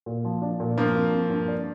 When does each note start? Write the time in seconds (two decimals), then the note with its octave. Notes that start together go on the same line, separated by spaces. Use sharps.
0.06 A#2
0.25 F3
0.42 D4
0.60 A#2
0.77 G2 F3 A#3
0.95 C4
1.13 C4
1.30 G2
1.48 D5